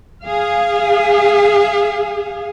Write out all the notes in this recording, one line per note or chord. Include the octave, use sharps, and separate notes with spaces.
G#4 F5